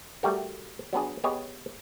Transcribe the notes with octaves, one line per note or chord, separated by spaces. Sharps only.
G3 A3 F#4 A#4
F#3 B3 D4 G#4
B3 G4 G#4 C#5 D#5 G#5